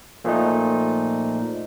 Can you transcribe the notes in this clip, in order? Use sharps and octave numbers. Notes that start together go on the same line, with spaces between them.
A#2 F3 A3 D#4